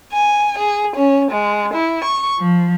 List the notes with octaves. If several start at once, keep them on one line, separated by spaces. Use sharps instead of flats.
G#5
G#4
C#4
G#3
E4
C#6
F3